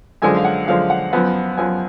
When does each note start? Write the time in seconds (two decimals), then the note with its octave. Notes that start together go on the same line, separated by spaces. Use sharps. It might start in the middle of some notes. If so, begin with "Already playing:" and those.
0.22 F#2 D3 F3 G#3 G#5
0.36 F5
0.45 F#5
0.67 F#2 D3 F3 G#3 F5
0.90 F#5
1.13 F#2 F3 B3
1.57 F#2 F3 B3 G#5